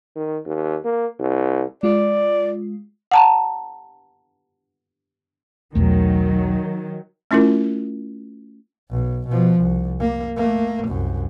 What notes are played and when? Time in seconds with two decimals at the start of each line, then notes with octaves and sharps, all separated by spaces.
0.16 D#3
0.45 D#2
0.85 A#3
1.20 C2
1.83 G#3 F4 D5
3.11 F#5 A5 A#5
5.75 B1 E2 D#3 F#3 A3
7.31 A3 C#4 E4 F4 A#4
8.90 B1
9.28 B2 F3
9.60 C2
10.00 A#3
10.37 A3 A#3
10.87 C2 F#2